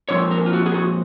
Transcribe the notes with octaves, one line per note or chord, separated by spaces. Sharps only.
A#2 F3 C4 C#5
A#4
F4
F#4
G#4
F#4